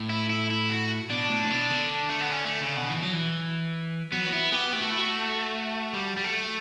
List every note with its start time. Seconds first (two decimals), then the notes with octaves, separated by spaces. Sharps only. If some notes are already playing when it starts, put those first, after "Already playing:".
Already playing: A2
0.10 E4
0.30 E4
0.50 E4
0.70 F#4
1.10 B2 D4
1.30 A2
1.45 A2
1.50 B2
1.70 D3
2.09 A3
2.21 B3
2.31 C#4
2.46 A3
2.61 C#3
2.77 B2
2.91 E3
3.03 F#3
3.13 E3
4.12 F#3 B3
4.26 F#4
4.32 B3 E4
4.52 B3 G4
4.73 A3 G4
4.82 F#4
4.90 E4
4.99 F#4
5.93 G3
6.17 G3
6.24 A3